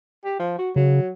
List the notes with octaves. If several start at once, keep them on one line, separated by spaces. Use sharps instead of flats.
G4
F3
F#4
C#3 F#3